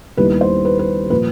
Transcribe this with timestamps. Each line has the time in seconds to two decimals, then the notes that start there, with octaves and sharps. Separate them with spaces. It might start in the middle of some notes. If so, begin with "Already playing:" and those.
0.17 D#2 D#3 G3 B3 E4 B4
0.41 C5
0.65 B4
0.79 B4
1.10 A#2 F3 B4